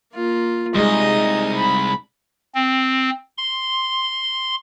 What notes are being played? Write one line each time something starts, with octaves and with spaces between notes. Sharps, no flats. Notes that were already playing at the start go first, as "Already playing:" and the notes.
A#3 F4
C2 G3 G#3 D#4 G#4 D#5 D#6
B5
C4
C6